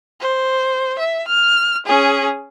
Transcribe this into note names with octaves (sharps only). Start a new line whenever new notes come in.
C5
E5
F6
C#4 G#4